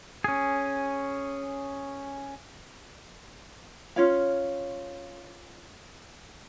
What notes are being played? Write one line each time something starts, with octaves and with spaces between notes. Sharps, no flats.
C#4 G#4
C#4 F4 C#5 F5